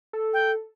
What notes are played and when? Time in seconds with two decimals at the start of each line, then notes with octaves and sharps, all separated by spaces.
0.13 A4
0.33 G5